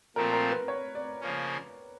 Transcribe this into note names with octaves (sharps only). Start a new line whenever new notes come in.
A#2 F3 A3 C4 F4 A#4
A#4
B4
C#5
D5
C#3 F3 A#3 C#4